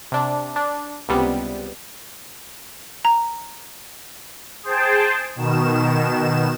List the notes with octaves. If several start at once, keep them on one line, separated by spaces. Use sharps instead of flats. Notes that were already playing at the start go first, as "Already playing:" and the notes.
C3 D4
D4
C#2 C3 G3 B3
A#5
G#4 C5 G5 A5
B2 D#3 E7